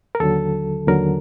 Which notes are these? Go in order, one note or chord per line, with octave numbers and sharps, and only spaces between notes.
A#4
D#2 D3 F#3 A4
D#2 D3 F#3 A#4